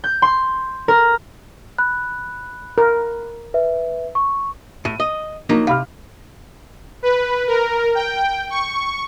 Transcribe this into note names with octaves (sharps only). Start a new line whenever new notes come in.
G6
C6
A#4
B5 F#6
A#4
B4 E5
C#6
A2 D#7
D#5
F3 F#3 A#3 D#4
C3 F5 B5 F6
B4
A#4
G5
C#6